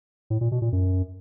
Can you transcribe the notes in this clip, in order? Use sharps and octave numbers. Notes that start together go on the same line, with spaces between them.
A2
A#2
B2
A#2
F#2